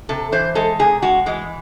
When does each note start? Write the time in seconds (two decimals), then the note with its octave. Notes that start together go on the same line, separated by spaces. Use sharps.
0.09 C3 A4
0.32 E3 C5
0.55 G#3 A4
0.79 C3 G#4
1.02 G#3 F#4
1.26 E3 G#3